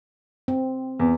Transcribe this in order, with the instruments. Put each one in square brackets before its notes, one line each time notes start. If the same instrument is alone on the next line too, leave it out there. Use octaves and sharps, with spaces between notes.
[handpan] C4
[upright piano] E2